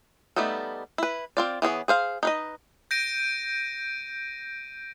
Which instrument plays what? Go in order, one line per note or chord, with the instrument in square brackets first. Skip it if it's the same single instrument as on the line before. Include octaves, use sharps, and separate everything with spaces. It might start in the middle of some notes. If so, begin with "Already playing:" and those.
[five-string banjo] G3 A3 B3 D#4 A4
E4 B4
C4 F4 D5
E3 B3 G#4 C#5
G#4 C5 F5
D#4 B4 D#5
[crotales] G6 A#6 D7 D#7